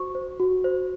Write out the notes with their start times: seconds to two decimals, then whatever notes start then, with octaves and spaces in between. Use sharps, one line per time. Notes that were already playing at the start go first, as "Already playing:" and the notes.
Already playing: F#4 C5 C#6
0.15 C5
0.40 F#4
0.64 C5